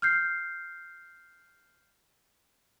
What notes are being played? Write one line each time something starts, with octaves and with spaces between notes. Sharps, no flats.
F6 G6 C7